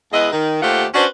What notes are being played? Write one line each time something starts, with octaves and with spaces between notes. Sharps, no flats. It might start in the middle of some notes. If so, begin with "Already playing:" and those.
E2 G#3 E4 B4 D#5
D#3
D#2 A3 F4 G4 C5 F#5
C#4 D4 F#4 B4 C5 D5